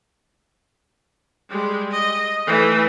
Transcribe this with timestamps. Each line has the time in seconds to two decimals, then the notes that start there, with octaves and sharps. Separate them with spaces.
1.49 G3 G#3
1.92 D#5
2.46 E3 A3